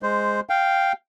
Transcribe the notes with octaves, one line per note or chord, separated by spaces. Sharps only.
G#3 C5
F5 G5